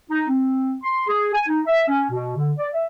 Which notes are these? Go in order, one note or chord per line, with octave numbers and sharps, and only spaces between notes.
D#4
C4
C6
G#4
G#5
D#4
E5
C#4
B2
D3
D5
E5